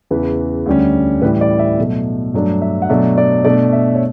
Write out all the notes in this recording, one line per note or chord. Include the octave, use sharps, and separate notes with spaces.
E2 C#3 E3 B4
D2 D3 G3 C#4
A2 E3 G3 B4
D5
E5
B2 F#3 A3
G2 F#3 A3 D4
E5
F#5
B2 F#3 A3 D4 E5
D5
B2 A3 D4 D5
E5
C#5